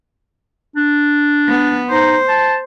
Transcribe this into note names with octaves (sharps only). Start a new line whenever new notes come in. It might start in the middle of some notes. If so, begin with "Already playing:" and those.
D4
B3
D#4 C5
A5